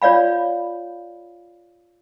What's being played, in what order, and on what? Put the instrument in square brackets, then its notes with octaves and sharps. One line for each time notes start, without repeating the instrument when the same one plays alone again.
[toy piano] F4 C#5 D5 F5 B5